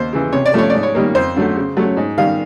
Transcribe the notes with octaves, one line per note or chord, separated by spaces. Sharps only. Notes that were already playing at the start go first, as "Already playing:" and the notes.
Already playing: D#2 C5
C#3 E3
C3 C#5
D5
F3 A3 C#4 C#5
G#2 D5
C#5
D#3 G3 A#3
F2 C5
D3 F#3 A3
C#3
F#3 A3 C#4
G#2
D#3 G3 F5